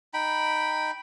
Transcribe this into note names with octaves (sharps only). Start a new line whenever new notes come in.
D#4 G5 B5